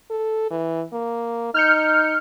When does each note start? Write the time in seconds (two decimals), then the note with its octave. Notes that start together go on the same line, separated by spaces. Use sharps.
0.10 A4
0.51 E3
0.93 A#3
1.54 D#4 F6 G6 C#7